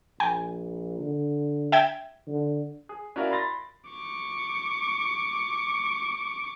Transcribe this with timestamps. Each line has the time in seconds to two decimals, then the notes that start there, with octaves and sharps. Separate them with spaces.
0.20 A#1 G5 G#5
0.99 D3
1.72 E5 G5 G#6
2.28 D3
2.89 G#4
3.16 C#4 E4 F#4 A#4 D5 F5
3.31 B5 C6 A6 A#6
3.90 C#6 D6